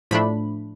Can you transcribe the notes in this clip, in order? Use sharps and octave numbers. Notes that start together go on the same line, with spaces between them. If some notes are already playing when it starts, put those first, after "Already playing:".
A2 F3 A3 D4 B5